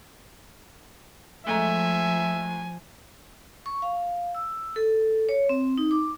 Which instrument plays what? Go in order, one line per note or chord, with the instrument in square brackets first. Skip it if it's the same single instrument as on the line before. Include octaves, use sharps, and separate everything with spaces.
[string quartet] F3 [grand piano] G#3 A3 A#5 [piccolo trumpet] E5 [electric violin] G#5
[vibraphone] C#6
F5
E6
A4
C#5
C4
D#4
D6